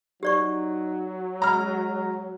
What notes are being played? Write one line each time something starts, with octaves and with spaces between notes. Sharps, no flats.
F#3 D#4 G4 D5 C#6
G#3 A#5 F6